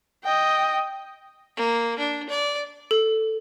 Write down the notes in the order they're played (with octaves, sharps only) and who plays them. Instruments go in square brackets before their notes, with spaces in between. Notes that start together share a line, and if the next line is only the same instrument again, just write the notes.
[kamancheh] D#5 G5
[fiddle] A#3
D4
D5
[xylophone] A4